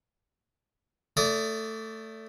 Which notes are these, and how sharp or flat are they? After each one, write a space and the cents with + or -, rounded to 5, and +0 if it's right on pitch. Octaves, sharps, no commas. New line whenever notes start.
A3 +10 D5 -25 D#6 +0